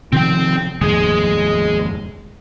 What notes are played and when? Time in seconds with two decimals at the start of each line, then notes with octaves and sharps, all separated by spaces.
0.13 C3 D#3 F3 C4 G5
0.81 F1 D#2 G#2 G#3 G#4